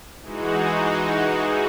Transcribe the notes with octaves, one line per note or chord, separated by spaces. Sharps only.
E3 G#3 D#4 F#4